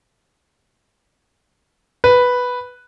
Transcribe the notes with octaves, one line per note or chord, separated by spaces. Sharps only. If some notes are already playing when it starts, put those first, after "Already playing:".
B4